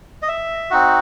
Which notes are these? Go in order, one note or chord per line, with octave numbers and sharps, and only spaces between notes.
D#5
E5
C4 D#4 F#4 F#5